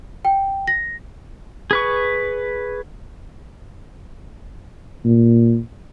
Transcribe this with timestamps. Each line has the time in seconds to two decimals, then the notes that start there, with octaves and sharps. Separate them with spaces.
0.25 G5
0.67 A#6
1.71 G#4 B4 C#6
5.04 A#2